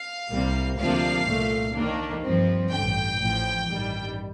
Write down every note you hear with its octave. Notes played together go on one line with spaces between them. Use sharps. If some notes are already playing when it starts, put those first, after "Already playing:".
Already playing: F5
C2 C3 G3 A#3
D2 C3 F3 A#3 D4 F5
C2 A#2 A3
D#2 D#3 A#3 D4
G2 F3 C4
A1 G2 D3 G5
A1 A2 F3
A1 G2 D#3 G3